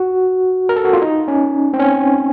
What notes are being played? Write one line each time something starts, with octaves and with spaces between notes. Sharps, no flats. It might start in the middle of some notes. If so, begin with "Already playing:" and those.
Already playing: F#4
A#4
A4
F#4
F4
D#4
C#4
C4
C#4